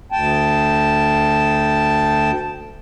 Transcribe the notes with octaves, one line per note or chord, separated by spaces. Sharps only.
D2 G5 A5